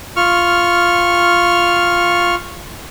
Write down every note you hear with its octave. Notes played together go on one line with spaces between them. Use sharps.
F4 C#6 F6